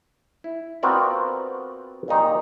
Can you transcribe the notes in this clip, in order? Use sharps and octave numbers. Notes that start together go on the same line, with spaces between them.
E4
B3 C4 F4 F#4 A#4 D5
A#2 D#3 D#4 G4